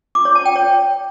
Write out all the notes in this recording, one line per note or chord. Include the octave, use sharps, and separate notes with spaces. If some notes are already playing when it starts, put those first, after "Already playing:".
D6
C#5
A5
G5
C#5